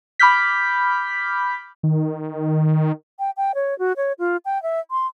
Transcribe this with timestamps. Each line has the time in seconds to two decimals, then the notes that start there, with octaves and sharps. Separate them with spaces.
0.19 B5 D6 F6 G6 B6
1.83 D#3
3.19 G5
3.37 G5
3.55 C#5
3.79 F#4
3.97 C#5
4.19 F4
4.45 G5
4.63 E5
4.91 C6